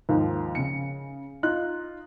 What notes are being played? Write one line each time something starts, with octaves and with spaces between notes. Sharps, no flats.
D#2 G#2 F3
C#3 C#7
D#4 F4 F#6